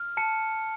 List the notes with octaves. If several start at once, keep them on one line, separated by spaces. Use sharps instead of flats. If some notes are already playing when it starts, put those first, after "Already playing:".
Already playing: F6
A5 C#7